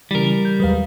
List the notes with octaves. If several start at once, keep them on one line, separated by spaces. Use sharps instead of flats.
C#3 E3 G3 A#4
G6
D#2 F#3 G#3 B4 F5